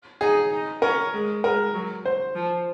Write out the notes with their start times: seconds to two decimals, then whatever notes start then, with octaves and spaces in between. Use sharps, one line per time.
0.21 D#4 G#4
0.52 D#4
0.82 C#4 A#4
1.13 G#3
1.44 G#3 A#4
1.74 F#3
2.05 C5
2.36 F3